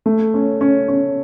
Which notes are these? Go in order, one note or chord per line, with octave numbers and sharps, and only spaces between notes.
A3
C#4
C#4
C#4